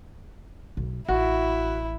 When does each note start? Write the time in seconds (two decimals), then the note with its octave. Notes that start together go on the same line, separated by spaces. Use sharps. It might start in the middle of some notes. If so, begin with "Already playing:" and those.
0.77 B1
1.08 A1 E4 F#4